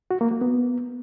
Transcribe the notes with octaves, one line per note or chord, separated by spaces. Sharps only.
F#4
A#3
A#3
B3